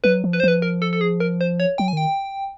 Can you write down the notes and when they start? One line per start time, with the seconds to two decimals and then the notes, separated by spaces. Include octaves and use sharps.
0.04 F#3 B4
0.24 F3
0.33 B4
0.40 C5
0.44 F3 B4
0.62 A#4
0.82 A4
0.93 A4
1.01 G#4
1.20 A#4
1.41 C5
1.60 C#5
1.78 F#3 G5
1.88 G#5
1.93 D#3 G5